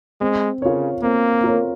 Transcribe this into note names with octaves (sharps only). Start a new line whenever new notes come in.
G#3 C4
C#3 F4 A#4 C#5
A#3 C4
F4 A#4 C#5